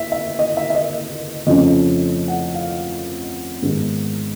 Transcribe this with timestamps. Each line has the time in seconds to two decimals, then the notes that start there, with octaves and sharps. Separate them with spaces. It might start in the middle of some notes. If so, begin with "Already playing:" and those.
Already playing: E5
0.12 E5
0.39 D#5
0.57 E5
0.70 E5
0.75 D#5
1.47 F2 C#3 F3 A3 C#4 D#5
2.28 F#5
2.54 F5
3.62 G#2 D#3 G#3 B3